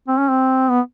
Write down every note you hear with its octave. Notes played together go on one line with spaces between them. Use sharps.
C4
C#4
C4
B3